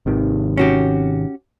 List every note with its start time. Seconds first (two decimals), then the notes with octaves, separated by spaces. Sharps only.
0.06 G#1 C3 D#3
0.57 C#4 F#4 G4